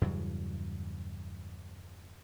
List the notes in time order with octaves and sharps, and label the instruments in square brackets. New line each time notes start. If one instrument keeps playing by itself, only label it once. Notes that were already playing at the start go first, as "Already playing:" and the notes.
[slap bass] E2 G2 C#3 F#3